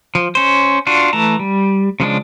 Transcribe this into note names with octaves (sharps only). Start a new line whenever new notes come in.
F3
C#4 C5
D4 F4 F#4
E3 A3 A5 A#5
G3
C#3 F3 G#3 D4